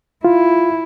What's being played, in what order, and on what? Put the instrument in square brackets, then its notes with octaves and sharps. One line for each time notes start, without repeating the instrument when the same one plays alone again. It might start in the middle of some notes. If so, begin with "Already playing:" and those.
[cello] E4 [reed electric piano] F4